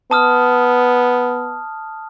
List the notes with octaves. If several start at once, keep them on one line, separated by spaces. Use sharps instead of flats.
B3 A5 D#6 F6